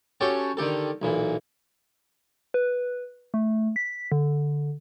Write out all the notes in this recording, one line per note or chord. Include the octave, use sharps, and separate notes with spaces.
C#4 F#4 G4 A4 G5 A5
D3 D#3 G4 A4
B1 A#2 E3
B4
A3
B6
D3